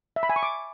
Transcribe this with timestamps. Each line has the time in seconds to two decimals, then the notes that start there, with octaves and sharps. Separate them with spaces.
0.16 E5
0.23 B5
0.30 G#5
0.36 C#6
0.43 D6